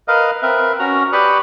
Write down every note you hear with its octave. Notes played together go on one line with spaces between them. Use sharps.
A#4 B4 D#5 F5
C4 A#4 B4 E5
C#4 F#4 A#5
G4 B4 D5 B5 C#6 D#6